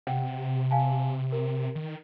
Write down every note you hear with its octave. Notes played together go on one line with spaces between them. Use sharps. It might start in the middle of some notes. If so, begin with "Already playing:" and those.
C3 F#5 G5
F5 G#5 A5
A#4
D#3